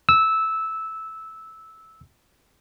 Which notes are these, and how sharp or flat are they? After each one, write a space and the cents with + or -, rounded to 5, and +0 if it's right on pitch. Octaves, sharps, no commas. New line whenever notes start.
E6 -10